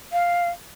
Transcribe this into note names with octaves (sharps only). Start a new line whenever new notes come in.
F5